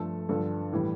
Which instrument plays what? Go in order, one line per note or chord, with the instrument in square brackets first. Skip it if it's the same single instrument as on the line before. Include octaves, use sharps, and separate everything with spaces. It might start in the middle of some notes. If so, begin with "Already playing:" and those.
Already playing: [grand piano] G2 F3 A3 A4
G2 D3 F3 A4
A2 E3 G3